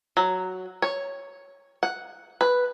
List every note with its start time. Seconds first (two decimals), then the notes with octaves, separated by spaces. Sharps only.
0.17 F#3
0.82 C#5
1.83 F#5
2.41 B4